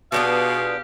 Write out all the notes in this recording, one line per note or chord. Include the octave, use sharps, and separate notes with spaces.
B2 B3 D4 F4 G4 G#4 F5